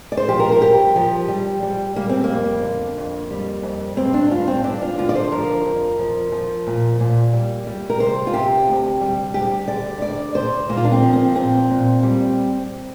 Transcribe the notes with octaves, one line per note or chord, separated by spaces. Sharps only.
D5
C5
F3 G4
A#4
A#4
G2 G4
F3
G3
G3
G3 A#3
C4
A#3
F2
D3
F2
G3
F2
G2 C4
D4
G2 F4
C4
G2 D4
F4
D3 F4
D5
C5
F3 A#4
F2
F3
F3
A#2
A#2
G3
G3
A#4
C3 C5
F4
C3 G4
D2
G3
D2 G4
D3 D5
D2 D5
D2 C5
A#2 A#3
F4
D4
C4
F3
C4
A#2 C4
A#2
G3